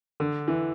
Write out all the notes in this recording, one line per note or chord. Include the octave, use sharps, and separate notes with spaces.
D3
E3